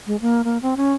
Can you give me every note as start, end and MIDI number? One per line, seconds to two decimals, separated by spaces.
0.07 0.16 56
0.21 0.42 58
0.44 0.58 58
0.62 0.75 60
0.77 0.93 61